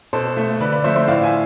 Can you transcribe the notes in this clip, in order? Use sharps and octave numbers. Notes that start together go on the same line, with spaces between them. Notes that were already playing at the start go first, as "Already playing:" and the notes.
B2 A4 C5
A3
D3 B4 D5
B4 D5
F3 A3 C5 E5
C5 E5
A2 D5 F5
E5 G#5